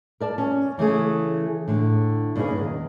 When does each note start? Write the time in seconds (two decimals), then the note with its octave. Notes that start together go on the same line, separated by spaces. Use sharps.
0.20 A#4 D5 A5
0.38 C#4
0.78 C#3 E3 A3 G#4
1.68 A2 D3
2.36 G2 C#3 A#3 B3 D#4 G#4
2.56 E2 D#3